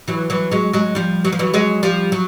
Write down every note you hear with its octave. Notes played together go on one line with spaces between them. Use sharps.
E3 F#3
E3 F#3
F#3 G#3
F#3 G#3
F3 G3
F#3
F3
E3 F#3
F#3 G#3
F3 G3
F#3